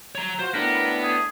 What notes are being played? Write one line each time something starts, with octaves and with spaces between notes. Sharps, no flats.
C#5 A#5
F4 F#4 C5
A2 B3 D4 A#4
G#4